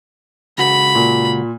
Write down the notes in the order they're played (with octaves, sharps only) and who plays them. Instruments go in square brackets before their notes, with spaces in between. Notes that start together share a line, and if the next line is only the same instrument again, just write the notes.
[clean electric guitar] C#2 F#4 [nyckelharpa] B5
[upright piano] A#2